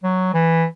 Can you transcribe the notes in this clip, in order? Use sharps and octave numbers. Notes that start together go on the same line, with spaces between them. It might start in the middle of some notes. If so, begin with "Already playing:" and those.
F#3
E3